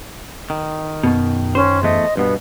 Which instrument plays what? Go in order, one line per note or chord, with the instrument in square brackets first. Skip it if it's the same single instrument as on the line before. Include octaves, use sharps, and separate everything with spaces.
[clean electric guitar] D#3
[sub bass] F#2 [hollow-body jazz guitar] B2
[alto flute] C#4 [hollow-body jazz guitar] C5
[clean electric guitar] E2 A3 [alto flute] D#5
[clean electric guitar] G2 B2 [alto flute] B3